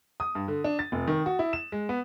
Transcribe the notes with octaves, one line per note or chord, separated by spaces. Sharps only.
D#6
G2
D3
D4
A6
F1
D#3
F#4
E4
E7
G#3
B3